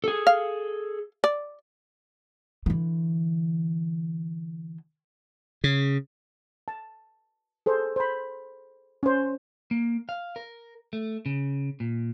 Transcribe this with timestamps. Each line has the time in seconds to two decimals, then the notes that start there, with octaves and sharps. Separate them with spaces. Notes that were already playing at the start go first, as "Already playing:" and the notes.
0.04 G#4 A4
0.27 F5
1.24 D5
2.66 D3 E3
5.64 C#3
6.68 A5
7.66 G#4 A4 C5
7.96 C5 B5
9.03 C#4 C5
9.71 A#3
10.09 F5
10.36 A#4
10.93 A3
11.26 C#3
11.80 A#2